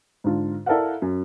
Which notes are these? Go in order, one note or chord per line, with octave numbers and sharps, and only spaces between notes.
G#2 D3 F4
E4 A4 A#4 D5 F5 F#5
F#2